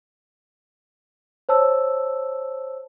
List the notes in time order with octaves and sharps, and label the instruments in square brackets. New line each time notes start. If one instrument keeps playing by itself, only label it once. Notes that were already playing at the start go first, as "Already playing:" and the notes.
[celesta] C5 C#5 A5 E6